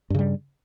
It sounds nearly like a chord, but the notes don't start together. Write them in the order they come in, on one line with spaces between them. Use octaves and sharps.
G2 C#3 G3